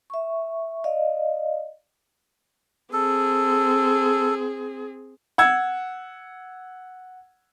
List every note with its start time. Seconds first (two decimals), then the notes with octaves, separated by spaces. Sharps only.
0.10 E5 C#6
0.84 D5 D#5 F5
2.93 C4 G#4 A4
5.38 F#5 E6 G#6